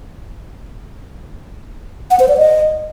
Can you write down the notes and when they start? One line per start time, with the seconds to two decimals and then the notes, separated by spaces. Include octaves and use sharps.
2.11 F#5
2.20 C5
2.28 D5
2.37 D#5